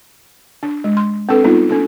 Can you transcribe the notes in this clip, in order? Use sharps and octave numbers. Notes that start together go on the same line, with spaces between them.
D4
G#3
C6
C4 D4 A4 B4
G3 B3 D#4 F4
C#4 D4 A4